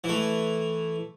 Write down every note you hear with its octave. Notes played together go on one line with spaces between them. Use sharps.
E3 A3